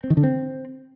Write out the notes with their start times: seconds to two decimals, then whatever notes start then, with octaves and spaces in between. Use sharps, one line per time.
0.04 C4
0.10 D#3
0.17 D3
0.24 C4